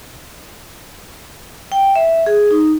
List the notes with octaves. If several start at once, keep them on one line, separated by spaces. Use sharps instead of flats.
G5
E5
G#4
D#4